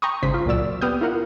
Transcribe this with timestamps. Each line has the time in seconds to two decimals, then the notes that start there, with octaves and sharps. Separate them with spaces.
0.02 G5 A#5 B5 C#6 D#6
0.22 G#1 C#3 C5 B6
0.34 F4
0.46 C#2 A#2 F#3 D5 E6
0.81 B3 G4 D#6 F6 G6
1.01 E4 F4 A#4 F#5